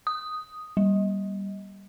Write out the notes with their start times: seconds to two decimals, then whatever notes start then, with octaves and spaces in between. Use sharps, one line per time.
0.07 D#6
0.77 G3